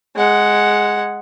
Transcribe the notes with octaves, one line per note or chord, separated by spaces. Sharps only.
G#3 F#5